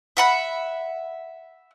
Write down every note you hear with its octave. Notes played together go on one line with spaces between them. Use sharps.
E5 F#5 B5